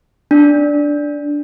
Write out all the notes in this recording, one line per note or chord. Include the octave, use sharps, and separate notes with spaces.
D4